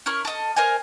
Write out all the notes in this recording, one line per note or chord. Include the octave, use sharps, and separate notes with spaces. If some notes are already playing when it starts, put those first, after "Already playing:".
C#4 E4 A#4 C#6
A4 D#5
A#4 C5 D#5 G#5